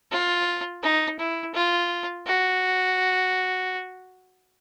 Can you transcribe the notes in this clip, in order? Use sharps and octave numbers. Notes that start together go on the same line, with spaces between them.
F4
D#4
E4
F4
F#4